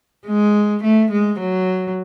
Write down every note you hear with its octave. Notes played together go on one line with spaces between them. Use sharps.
G#3
A3
G#3
F#3